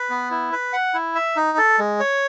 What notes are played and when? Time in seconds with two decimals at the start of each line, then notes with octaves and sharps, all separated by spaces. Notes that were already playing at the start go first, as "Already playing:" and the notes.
Already playing: B4
0.10 B3
0.31 E4
0.52 B4
0.73 F#5
0.94 E4
1.15 E5
1.36 D#4
1.58 A4
1.79 G#3
2.00 C#5